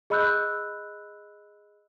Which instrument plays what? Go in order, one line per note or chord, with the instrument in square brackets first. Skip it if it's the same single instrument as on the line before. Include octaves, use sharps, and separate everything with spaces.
[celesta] G#4 D#5 B5 E6 F#6 G6